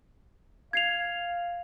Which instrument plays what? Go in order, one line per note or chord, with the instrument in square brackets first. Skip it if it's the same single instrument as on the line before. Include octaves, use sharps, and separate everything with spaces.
[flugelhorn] F5 [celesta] G#6 C7 F7